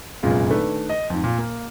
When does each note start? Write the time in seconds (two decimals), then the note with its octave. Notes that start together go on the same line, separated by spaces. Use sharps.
0.23 F1 F#2 A#2 G#3 B3 F4
0.50 D#3 A3 D4 B4
0.89 D#5
1.10 F2 G#2
1.24 A#2
1.38 A#3